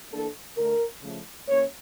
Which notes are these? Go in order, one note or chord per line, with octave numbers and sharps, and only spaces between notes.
E3 A#3 D4 A4
D3 A3 D4 A#4
C#3 F3 A3
E3 A#3 C#4 C#5